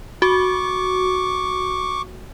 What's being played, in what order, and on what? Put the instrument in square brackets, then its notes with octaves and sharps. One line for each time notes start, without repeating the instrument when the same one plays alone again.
[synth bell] F#4 [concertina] C#6 D6